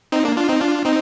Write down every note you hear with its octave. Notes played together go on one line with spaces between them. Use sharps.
C4 D#4
A#3 D4
D4 F4
C4 D#4
D4 F4
C4 D#4